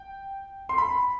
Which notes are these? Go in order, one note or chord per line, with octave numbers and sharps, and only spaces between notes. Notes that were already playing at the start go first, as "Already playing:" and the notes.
Already playing: G5
C6
B5